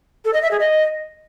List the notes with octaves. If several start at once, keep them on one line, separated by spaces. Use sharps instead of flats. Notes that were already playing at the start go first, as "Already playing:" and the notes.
A4
D#5
E5
G#4
D#5